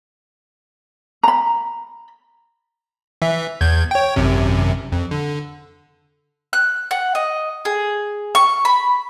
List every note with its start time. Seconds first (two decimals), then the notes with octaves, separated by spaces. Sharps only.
1.23 A#5 B5
3.22 E3 E5
3.61 E2 G6 G#6
3.91 C#5 G5
4.16 G#1 F#2 C3
4.92 F2
5.11 D3
6.53 F#6
6.91 F#5
7.15 D#5
7.65 G#4
8.35 C#6
8.65 B5